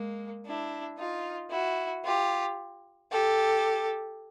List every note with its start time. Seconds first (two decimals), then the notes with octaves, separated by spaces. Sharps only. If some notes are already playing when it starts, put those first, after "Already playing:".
Already playing: G#3 A#3
0.45 D4 E4
0.97 D#4 F4
1.51 E4 F#4
2.05 F4 G4
3.12 G4 A4